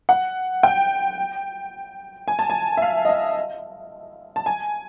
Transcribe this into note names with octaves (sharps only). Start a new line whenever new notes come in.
F#5
G5
G#5
A5
G#5
E5
F5
D#5
E5
A5
G#5